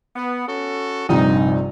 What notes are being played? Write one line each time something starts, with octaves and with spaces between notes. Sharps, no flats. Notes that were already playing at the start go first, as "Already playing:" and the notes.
B3
C#4 F#4 A4
A#1 G2 C3 D#4